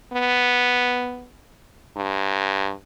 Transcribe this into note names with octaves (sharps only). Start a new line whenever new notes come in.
B3
G2